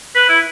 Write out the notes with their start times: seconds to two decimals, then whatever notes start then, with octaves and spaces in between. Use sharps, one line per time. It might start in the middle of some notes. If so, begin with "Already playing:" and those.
0.15 B4
0.29 E4